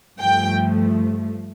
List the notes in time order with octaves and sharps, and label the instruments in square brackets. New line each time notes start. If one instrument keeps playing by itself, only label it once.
[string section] G2 F3 A3 G5